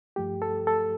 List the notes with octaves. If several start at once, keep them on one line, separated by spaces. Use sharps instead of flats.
G2 F3 A3 G4
A4
A4